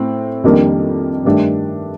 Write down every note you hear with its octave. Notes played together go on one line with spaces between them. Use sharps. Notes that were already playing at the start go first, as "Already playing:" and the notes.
Already playing: A2 C4
F2 D#3 G3 A#3 D4
G2 D#3 A3 D4 G4